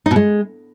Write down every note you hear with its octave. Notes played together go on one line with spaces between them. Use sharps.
D#4
B2
G#3